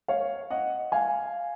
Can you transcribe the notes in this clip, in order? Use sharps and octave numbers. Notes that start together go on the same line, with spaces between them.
C#5 F5
D#5 F#5
F5 G#5